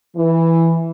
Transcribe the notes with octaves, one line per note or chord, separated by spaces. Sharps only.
E3